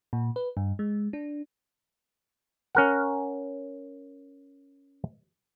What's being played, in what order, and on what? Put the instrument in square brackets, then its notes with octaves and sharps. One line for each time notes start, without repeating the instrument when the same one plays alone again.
[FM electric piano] A#2
B4
G2
G#3
D4
[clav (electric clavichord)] C#4 A#4 F#5